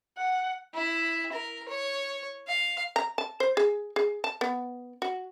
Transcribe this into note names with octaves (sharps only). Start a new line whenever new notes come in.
F#5
E4
A#4
C#5
F5
A#5
A5
C5
G#4
G#4
A5
B3
F#4